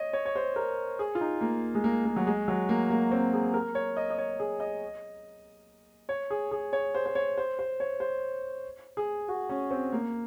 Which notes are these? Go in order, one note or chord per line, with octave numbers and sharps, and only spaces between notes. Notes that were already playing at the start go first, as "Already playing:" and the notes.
Already playing: C#5 D#5
C#5
C#5
C5
A#4
G#4
F4
D#4
A#3
G#3
A#3
A#3
F#3
G#3
F#3
A#3
A#3
C4
G#4
A#4
C#5
D#5
D#5
C#5
G#4
D#5
C#5
G#4
G#4
C#5
C5
C5
C#5
C5
C5
C#5
C5
G#4
F#4
C#4
C4
A#3